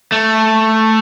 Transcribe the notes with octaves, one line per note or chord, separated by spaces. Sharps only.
A3